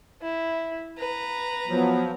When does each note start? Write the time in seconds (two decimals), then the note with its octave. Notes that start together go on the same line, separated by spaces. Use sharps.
0.21 E4
0.98 B4 A#5
1.68 F3 F#3 B3